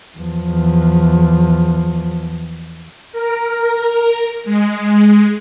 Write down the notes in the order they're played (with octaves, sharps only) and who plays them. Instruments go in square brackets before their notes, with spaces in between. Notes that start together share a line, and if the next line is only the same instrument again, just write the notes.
[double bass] E2 F3
[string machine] A#4
G#3